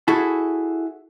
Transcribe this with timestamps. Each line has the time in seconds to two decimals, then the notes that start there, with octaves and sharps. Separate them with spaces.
0.08 E4 F#4 G#4 A4